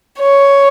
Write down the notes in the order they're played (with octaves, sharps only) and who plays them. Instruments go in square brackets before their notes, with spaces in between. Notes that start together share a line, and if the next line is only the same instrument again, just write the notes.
[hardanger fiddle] C#5